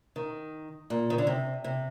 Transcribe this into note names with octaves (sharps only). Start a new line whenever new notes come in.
D#3
A#2
D#3
D3
C3
C3